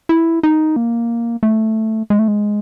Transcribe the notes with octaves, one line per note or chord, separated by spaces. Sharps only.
E4
D#4
A#3
A3
G#3
A3
G#3